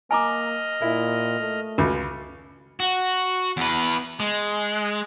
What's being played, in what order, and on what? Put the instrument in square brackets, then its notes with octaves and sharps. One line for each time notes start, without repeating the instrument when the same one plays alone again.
[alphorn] A#3 [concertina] D#5 F6 [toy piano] G#5 A#5 D6
[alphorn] A#2 [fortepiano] E4
[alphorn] A3
[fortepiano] C#2 [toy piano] F4 F#4
[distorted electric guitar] F#4
E2 B4
G#3